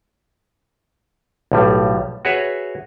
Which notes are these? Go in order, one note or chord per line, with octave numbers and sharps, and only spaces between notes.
B1 A2 G3
F#4 G#4 B4 C#5 E5